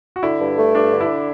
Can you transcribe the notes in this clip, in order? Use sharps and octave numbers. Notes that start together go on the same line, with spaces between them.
F#4
D3 E4
G2
A3
G2 D4
D3
E4